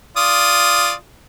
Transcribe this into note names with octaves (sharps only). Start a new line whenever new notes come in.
F4 D5 D#6